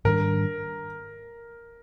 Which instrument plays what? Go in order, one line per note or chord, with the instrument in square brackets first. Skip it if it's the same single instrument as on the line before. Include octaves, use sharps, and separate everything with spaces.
[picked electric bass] G#2 D#3 G3 D4 [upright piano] A#4